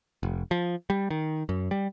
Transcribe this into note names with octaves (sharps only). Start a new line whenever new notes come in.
F1
F3
G3
D#3
F#2
G3